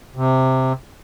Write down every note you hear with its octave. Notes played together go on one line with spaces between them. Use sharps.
C3